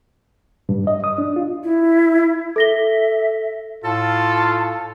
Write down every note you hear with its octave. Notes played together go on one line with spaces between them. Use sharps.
G2
D#5
D#6
D4
F4
E4
A4 E5 A#6 G7
A2 F4 A4 A5